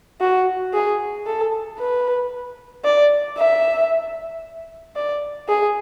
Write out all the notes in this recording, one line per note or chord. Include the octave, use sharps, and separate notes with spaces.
F#4
G#4
A4
B4
D5
E5
D5
G#4